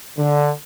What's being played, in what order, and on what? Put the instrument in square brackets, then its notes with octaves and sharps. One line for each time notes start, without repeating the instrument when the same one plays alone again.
[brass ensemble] D3